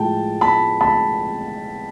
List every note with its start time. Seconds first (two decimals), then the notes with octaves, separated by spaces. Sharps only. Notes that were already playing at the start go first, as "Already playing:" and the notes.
Already playing: A2 F3 G#3 G5 A5
0.41 A5 B5
0.81 A5 B5